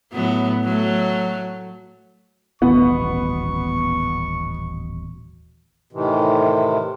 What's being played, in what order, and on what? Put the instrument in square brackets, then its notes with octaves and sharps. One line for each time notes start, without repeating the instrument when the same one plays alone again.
[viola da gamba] A2 F#3 B3
F#3 A3
[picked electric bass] D#1 A1 B2 [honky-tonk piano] B3 [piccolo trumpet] C#6
[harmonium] A2 C3 D#3 E3